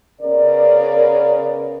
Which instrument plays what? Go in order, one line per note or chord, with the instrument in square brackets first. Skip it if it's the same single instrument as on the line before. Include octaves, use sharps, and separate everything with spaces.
[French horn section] C#3 B3 A#4 D5